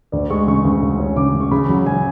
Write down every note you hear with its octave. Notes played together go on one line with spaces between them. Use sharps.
D2 D5
G#3 C#6
C#3 C#6
D2
C#3
C#4
C#3 D6
C#3
C#6
C#3 B5
F#3
C#3 G#5